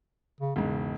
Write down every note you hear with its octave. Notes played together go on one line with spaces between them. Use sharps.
C#3
E1 G#2 C#3